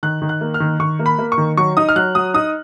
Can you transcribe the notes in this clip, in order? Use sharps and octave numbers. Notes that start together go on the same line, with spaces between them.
D#3 F#6
D#3
F#6
A#3
F6
D#3
D#3 C#6
A#3
B5
A#3
C#6
D#3
F#3 C#6
D#4 D#6
F6
F#3 F#6
F#3 D#6
D#4 D#6